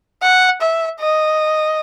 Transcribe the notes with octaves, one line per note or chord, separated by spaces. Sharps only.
F#5
E5
D#5